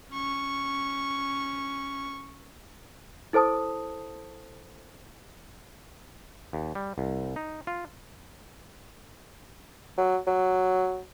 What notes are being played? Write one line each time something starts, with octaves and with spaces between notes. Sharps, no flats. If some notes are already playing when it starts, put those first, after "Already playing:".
C#4 C#6
E4 A4 C5 A5 D#6
D#2
G3
C2
D#4
F4
F#3
F#3